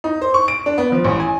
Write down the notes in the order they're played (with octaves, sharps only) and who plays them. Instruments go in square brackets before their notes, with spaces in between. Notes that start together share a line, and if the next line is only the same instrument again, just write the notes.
[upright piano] D#4
C5
C#6
D7
D4
B3
F3
A1
G#5